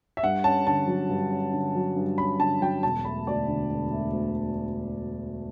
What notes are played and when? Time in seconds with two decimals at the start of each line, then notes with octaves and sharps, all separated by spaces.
0.17 E5
0.23 G2 F#5
0.44 C#4 A5
0.67 D3 A5
0.87 F#3
1.09 G2
1.31 C#4
1.53 D3
1.75 F#3
1.96 G2
2.18 C#4 B5
2.39 D3 A5
2.61 F#3 G5
2.83 E1 A5
3.05 A3 B5
3.27 D2 D5
3.48 D3
3.69 E1
3.91 A3
4.13 D2